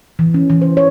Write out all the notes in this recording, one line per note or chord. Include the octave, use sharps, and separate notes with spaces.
E3
C#4
E3
C5
C#5